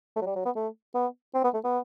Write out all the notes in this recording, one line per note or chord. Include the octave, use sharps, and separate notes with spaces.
A3
F#3
G3
F#3
B3
A3
B3
C4
B3
A3
B3